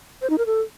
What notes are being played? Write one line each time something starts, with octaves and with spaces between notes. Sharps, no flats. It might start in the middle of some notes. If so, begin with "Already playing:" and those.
C5
D#4
A#4
A4